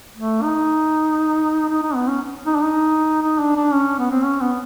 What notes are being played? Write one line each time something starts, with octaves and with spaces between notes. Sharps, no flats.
A3
D#4
D#4
D#4
B3
C#4
D#4
D4
D#4
D#4
D4
D4
C#4
B3
C4
C#4
B3